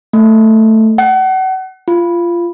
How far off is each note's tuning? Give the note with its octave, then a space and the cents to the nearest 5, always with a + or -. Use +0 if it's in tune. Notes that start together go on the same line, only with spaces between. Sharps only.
A3 +5
F#5 +35
F4 -20